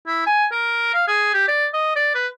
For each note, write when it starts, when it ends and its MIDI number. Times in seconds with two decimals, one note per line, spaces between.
0.07 0.24 64
0.26 0.46 80
0.52 0.93 70
0.94 1.05 77
1.08 1.29 68
1.33 1.47 67
1.48 1.66 74
1.73 1.95 75
1.96 2.10 74
2.15 2.27 71